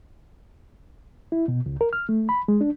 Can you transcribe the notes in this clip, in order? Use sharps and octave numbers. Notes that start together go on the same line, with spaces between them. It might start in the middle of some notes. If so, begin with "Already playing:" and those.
E4
B2
C#2
A#4
F6
A3
B5
G#3
D4